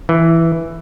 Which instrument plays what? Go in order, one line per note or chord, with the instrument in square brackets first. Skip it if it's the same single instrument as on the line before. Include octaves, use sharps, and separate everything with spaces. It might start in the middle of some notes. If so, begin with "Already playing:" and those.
[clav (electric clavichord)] E3